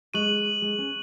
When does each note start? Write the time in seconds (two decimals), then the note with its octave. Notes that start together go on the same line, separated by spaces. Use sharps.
0.14 G#3 C#6 F#6 D#7 F#7
0.62 G#3
0.78 C#4